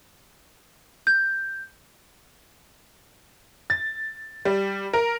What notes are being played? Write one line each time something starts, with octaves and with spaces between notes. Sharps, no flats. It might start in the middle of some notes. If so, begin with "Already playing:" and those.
G6
A6
G3
A#4